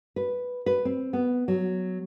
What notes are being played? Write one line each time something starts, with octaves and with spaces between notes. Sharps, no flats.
B4
B4
C4
B3
F#3